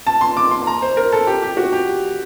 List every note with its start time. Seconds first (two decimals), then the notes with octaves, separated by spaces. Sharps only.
0.07 A5
0.21 C6
0.37 D6
0.51 C6
0.67 A#5
0.82 C5
0.97 A#4
1.12 A4
1.27 G4
1.42 G4
1.57 F#4
1.73 G4